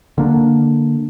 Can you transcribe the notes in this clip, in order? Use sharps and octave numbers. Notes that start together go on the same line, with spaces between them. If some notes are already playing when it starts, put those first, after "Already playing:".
D3 A#3 D4